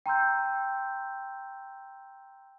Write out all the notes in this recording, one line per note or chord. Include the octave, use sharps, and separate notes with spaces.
G5 A#5 C6 E6 G6